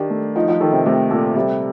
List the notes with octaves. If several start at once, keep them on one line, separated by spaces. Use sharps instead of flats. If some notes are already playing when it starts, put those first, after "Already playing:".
Already playing: D#3 D4 G4
A3
F3 D#4
F3
D#3 A4
C3
C3 A3
A#2 A4
C3 G3